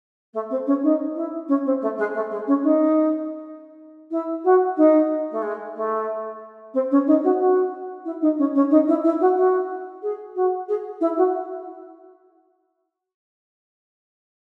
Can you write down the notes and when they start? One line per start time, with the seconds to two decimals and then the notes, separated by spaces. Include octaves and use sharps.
0.33 A3
0.50 C4
0.66 C#4
0.82 D#4
1.15 E4
1.48 C#4
1.65 C4
1.81 A3
1.97 G#3
2.14 A3
2.30 G#3
2.47 C#4
2.63 D#4
4.11 E4
4.44 F#4
4.77 D#4
5.31 A3
5.42 G#3
5.75 A3
6.73 C4
6.91 C#4
7.07 D#4
7.23 F#4
7.39 F#4
8.05 E4
8.21 D#4
8.38 C#4
8.55 C#4
8.70 D#4
8.87 E4
9.04 E4
9.20 F#4
9.36 F#4
10.02 G#4
10.35 F#4
10.68 G#4
11.00 E4
11.17 F#4